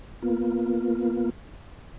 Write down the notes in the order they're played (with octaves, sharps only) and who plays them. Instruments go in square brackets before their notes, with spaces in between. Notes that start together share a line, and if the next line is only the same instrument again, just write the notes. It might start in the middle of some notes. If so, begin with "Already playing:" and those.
[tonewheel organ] A#3 B3 F4